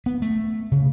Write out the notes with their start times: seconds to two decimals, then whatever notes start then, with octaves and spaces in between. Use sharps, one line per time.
0.06 B3
0.22 A3
0.72 C#3